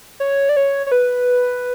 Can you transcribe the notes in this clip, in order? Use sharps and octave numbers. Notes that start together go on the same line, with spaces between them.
C#5
D5
C#5
C#5
B4